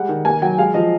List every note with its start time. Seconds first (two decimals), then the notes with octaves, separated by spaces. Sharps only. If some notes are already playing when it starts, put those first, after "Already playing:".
Already playing: G3 G#3 F#5
0.09 D#3
0.25 A#3 G#5
0.42 F#3 G5
0.58 G#3 F5
0.74 F3 D#5